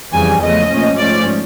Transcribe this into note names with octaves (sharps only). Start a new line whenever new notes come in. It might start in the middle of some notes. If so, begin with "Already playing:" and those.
F2 C#3 E3 G3 G#5
E2 C#3 F3 A3 D#5
A#2 F3 A3 C#4
G#2 F3 A3 C#4 D5